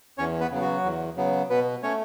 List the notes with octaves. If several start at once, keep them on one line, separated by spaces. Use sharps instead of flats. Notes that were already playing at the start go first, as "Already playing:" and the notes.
E2 C#4 C#5
B3 B4
C#3 F#3 B3
F#3 F#4
E2
C#3 F#3 B3
B2 B3 B4
A3 C#4 C#5